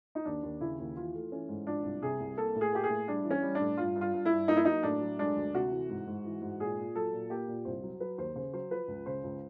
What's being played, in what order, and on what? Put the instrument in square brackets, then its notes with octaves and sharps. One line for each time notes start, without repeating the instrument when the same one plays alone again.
[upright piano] D#4
D#2 D4
D#2
C#3 E4
D#2
E3 F4
A3
E3 C#4
G#2
F3 D4
C2
C3 G#4
C2
A#3 A4
A2
G#4
A#3 G4
G#4
A2
G3 D4
E3
C#4
G3
D4
A2
G2 F4
G2
F4
G2
E4
G2
A#3 D#4
E4
F#3 D#4
A2 D4
F#3
G#3 D4
D2
C3 F#4
E3
G#2
G#2
E3
G#2
A#2 G#4
A#2
F#3 A4
A#2
A#3 G4
A#2
C2 C5
F#3
F#3 B4
D#2 C5
C#3 C5
F#3 C5
F3 B4
C#2
C#3 C5
C#2